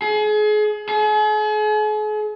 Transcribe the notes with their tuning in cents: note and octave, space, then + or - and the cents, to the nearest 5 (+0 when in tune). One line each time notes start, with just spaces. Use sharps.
G#4 +35
G#4 +45